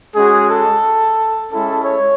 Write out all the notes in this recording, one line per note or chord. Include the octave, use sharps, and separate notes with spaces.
G#3 C#4 F#4 G#4
A4
G#3 C#4 E4 A4
C#5